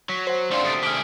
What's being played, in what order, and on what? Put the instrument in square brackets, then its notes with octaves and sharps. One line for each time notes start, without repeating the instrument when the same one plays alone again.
[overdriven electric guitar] F#3 [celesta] B6
[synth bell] C5 F#5
[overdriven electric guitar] D3 F3 [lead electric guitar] A3 C4 [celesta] D5 F5 C6
[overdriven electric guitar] D2 C3 [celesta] D#6 A6 D7
[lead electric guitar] D4 G#4 [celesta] F6 G7 [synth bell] B6 D7